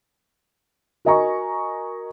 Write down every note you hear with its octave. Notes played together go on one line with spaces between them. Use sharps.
F#4 A#4 D#5 G#5 A#5 C#6